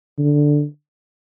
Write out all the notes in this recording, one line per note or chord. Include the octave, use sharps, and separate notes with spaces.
D3